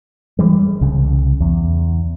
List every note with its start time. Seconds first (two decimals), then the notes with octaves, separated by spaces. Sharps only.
0.39 E3 G3 G#3
0.81 C2 C#3
1.41 E2